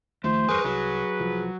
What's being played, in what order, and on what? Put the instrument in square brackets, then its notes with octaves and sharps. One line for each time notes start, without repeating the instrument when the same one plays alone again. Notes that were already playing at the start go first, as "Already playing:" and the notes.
[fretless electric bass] D#2 D#3 F3 [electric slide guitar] A3 [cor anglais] C5
[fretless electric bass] E2 G2 [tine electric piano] G#4 C#6 [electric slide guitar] A#4 B4
[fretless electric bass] C2 [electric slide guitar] F#3 [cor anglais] B4
[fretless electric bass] C2 F3